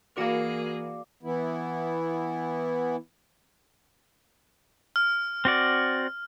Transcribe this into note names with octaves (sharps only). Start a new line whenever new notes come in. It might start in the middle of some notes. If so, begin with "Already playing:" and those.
E3 A#3 F#4 G#4 A#4 D5 F5
E3 B3 E4
F6
C4 F#4 D5